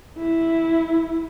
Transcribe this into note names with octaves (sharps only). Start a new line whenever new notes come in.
E4